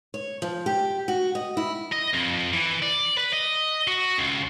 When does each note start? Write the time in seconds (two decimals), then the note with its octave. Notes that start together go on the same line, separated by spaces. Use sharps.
0.14 C#5
0.42 F3
0.66 G4
1.08 F#4
1.35 D#5
1.57 E4
1.92 D#5
2.14 F2
2.53 E3
2.82 D5
3.17 B4
3.33 D#5
3.87 F#4
4.18 C#2